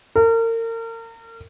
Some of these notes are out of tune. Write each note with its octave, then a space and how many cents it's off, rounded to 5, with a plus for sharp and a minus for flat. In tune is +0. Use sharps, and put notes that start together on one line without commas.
A#4 -35